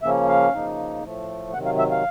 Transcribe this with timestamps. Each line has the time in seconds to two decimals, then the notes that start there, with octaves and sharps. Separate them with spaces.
0.02 C#3 F3 A#3 C#4 E5
0.28 F5
0.53 C#3 F3 A#3 D#4
1.03 A2 F3 A3
1.53 C3 D#3 F#3 F#5
1.65 F5
1.79 E5
1.91 F5